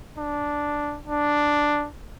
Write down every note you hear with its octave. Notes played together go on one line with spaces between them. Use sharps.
D4
D4